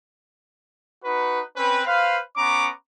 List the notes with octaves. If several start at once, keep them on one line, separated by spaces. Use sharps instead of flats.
D#4 F#4 B4
C4 C#4 B4
B4 C5 F5
B3 C#4 A#5 C#6 D6